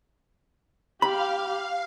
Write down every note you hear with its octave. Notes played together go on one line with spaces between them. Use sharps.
G4 F5 B5